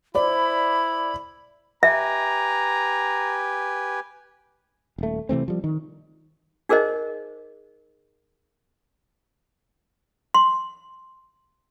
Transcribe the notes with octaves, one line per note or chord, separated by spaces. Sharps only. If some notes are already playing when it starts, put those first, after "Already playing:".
E4 C5 D5 B5
G4 B4 E5 G#5 A#5
D#1 A3
C3 E3 A3 C4
F3 G3
D#3
D#4 G#4 A#4 C5 D#5
C6